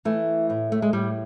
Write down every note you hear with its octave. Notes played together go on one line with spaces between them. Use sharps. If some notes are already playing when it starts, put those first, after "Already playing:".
E3 A3
A2
A3
G#3
A2 G3